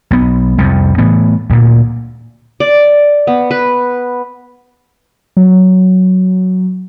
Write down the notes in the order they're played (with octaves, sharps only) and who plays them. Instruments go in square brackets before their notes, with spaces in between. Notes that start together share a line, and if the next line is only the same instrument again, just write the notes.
[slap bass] B1 B3
C2 F2 C3
A2 E3 B3
D2 A#2
[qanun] D5
B3
B4
[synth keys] F#3